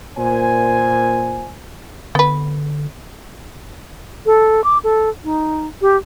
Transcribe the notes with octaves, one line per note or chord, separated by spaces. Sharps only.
A#2 C5 G#5
D3 B3 B4
A4
D6
A4
D#4
G4